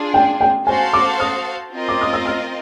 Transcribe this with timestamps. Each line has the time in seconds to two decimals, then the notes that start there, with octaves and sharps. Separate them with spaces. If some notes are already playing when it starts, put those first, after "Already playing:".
Already playing: D4 F4 G#4
0.14 G5
0.41 G5
0.67 F#4 A4 C5 F5 G#5 A5
0.93 D6
1.20 D#6
1.73 C4 F4 A#4 D#5
1.89 D6
2.01 D#6
2.13 E6
2.25 F6